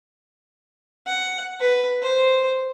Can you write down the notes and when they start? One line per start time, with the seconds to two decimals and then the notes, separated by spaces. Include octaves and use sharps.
1.07 F#5
1.60 B4
2.02 C5